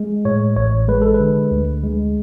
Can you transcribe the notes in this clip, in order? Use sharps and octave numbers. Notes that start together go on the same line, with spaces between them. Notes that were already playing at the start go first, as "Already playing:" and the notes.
Already playing: G#3
A2 C#5
A1 C#5
G#3 B4
A4
B4
D3
D2
G#3